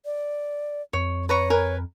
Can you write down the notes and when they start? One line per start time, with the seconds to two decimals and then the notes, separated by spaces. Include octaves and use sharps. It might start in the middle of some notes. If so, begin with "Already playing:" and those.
0.05 D5
0.93 F2 C#5
1.29 B4 C#5 A#5 C#6
1.50 A#4 B4 G#5